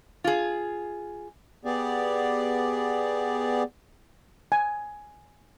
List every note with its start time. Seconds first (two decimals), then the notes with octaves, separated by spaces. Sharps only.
0.24 F4 G#4
1.65 B3 G4 G#4 D5
4.52 G#5